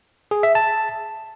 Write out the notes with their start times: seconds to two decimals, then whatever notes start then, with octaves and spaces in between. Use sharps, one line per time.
0.31 G#4
0.43 E5
0.55 A5